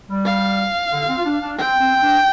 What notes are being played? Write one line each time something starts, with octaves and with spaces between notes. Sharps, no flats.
G3
F5
D3
C4
F4
D4
D4
C4 G5
C4
C4
D4